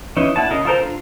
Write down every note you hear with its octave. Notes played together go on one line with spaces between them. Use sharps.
E3 C#4 D#4
D4 E4 F#4 A5
C#3 A#4 D#5
F4 A4 A#4 C5 A#5
D4 F4